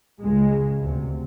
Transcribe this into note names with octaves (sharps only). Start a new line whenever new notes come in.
C#2 C#3 G#3
D2 C3